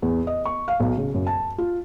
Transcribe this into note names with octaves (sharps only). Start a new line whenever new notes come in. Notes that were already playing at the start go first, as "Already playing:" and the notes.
E2
D#5
C#6
F5
B1
C#3
F#2
A5
F4